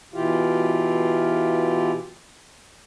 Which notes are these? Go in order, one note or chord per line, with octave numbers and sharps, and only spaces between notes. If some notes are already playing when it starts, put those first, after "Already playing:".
B2 E3 E4 F4 G4 F5